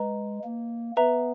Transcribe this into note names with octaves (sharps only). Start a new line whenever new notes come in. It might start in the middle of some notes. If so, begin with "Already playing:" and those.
Already playing: G#3 B4 D#5 A#5
A#3
B3 B4 E5 A#5